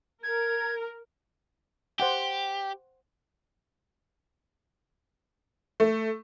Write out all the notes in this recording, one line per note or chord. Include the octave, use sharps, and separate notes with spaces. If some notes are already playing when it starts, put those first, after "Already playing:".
A#4 G#6
G4 C5 F#5 G5
A3